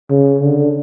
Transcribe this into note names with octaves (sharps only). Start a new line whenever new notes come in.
C#3
D3